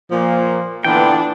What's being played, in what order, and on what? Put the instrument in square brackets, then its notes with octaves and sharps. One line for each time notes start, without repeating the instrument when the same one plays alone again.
[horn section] A#2 A#3 [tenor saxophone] F3
[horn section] A#2 D3 B3 [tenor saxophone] E3 [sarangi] D4 [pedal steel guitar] G5